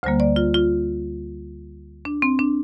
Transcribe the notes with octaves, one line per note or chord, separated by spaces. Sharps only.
D2 D3 G3 A#3 C5
D5
F4
F4
D4
C4
D4